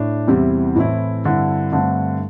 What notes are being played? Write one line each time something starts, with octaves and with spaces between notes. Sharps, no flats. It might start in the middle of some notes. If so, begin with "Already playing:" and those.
Already playing: A2 D4
E2 C3 G3 C4 E4
A2 E3 C4 E4
G2 D3 C4 E4
G2 D3 A3 C4